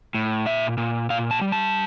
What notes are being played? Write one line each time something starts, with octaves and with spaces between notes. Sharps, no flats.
A2
A#2 E5
A#2
A#2 F5
A5
G3
A5